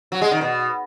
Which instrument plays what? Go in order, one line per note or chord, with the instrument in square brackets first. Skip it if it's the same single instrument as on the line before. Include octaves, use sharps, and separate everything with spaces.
[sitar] F#3
G#3
D#3
B2